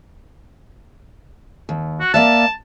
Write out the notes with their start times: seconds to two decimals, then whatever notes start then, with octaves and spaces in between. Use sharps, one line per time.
1.69 D#2
2.00 F#4
2.14 A#3 D5 E5 A5